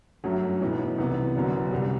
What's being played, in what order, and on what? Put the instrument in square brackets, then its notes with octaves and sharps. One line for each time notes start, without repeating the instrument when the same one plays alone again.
[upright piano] G1 F#2 F#3 A3
B1 A2 E3 B3
C2 C3 E3 B3
F#1 F#2 D3 F#3 B3
C2 C3 G3